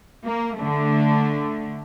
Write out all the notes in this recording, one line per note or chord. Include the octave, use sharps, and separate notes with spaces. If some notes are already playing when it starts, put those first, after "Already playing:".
A#3
D3 A3